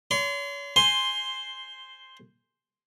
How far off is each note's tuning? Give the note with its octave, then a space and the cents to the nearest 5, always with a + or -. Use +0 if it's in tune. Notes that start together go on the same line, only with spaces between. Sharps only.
C#5 +35 C6 -30
C5 +0 G#5 +0 C6 +5